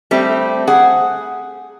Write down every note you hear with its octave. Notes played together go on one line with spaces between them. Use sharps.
G3 A3 C4
G#4 F#5